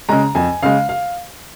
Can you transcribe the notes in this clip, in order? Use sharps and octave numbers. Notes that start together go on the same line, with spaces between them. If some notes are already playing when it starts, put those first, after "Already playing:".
C#3 G#3 A#5
F2 G#5
C#3 G#3 F5
F5